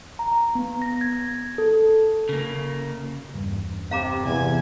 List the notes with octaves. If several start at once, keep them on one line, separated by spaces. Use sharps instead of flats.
A#5
B3
A#6
G#6
A4
C#3 A#3
E2 G2
C3 F5 A#5 D6
E2 C3 G#5